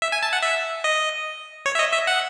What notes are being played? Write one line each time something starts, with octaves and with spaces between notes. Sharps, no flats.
E5
G#5
A5
F#5
E5
D#5
C#5
E5
D#5
E5
F#5